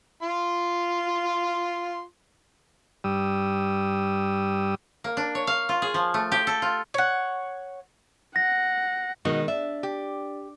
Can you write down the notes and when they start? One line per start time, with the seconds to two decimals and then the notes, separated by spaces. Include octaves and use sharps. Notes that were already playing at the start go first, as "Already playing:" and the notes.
0.22 F4 C6
3.04 G2 G3 D#6 E6
5.04 A#3
5.17 D4
5.35 C#5
5.47 F5
5.69 F4
5.82 G#4
5.94 F3
6.14 A3
6.32 G4
6.47 A4
6.62 F4
6.94 C#5 F#5
8.36 F#5 A#6
9.25 B2 D#3 G#3 D#4 F#4
9.48 D4 E5
9.83 G4